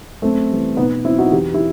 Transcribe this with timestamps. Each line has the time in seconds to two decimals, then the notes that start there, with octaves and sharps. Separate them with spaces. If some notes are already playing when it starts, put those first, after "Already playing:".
0.22 F#2 A3 C4
0.50 E3 G3
0.77 B2 B3 D#4
1.05 F#3 C4 E4
1.18 D#4 F#4
1.32 E2 G4
1.54 E4 G4